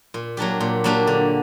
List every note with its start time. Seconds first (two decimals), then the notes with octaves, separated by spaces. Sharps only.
0.14 A#2
0.37 F#3 A#3 D4 G4
0.61 A#2
0.84 F#3 A#3 D4 G4
1.07 D3